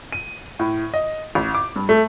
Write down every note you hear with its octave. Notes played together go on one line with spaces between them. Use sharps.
D#7
A2
D#5
A1
D6
G2
A3